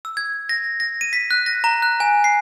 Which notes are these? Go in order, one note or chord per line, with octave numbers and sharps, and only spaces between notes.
E6
G#6
A#6
A#6
D#7
B6
F#6
A#6
A#5
F#6
G#5
C7